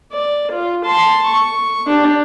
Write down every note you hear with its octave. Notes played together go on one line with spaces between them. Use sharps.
D5
F4
A5 C6
C#6
D4 G4